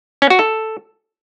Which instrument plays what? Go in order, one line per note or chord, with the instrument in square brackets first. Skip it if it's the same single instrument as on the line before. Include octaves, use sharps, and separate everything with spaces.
[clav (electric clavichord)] C#4
F#4
A4